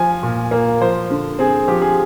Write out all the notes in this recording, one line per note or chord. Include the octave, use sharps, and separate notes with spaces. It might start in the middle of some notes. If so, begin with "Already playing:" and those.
Already playing: F3 G#5
A#2
A#3
F3 C5
D3
C4 G#4
F3 G4
G#4